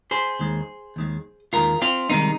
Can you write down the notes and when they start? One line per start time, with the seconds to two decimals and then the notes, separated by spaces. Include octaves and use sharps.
0.11 G#4 C5
0.39 D#2 D#3 G#3
0.96 D#2 D#3 G#3
1.53 D#2 D#3 G#3 F4 A#4
1.82 C4 F4
2.10 C2 C3 D#3 G#3 A#3 D#4